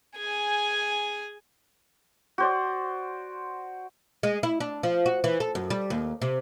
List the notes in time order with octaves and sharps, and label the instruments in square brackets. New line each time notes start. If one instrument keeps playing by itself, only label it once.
[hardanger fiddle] G#4 G#5
[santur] F#4 C5 D5
[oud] G#3
E4
D4
F3
F#4
E3
A4
F#2
G3
D#2
C3